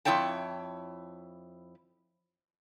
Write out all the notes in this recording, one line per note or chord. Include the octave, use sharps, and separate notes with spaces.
F2 E4 C#5 G5 A5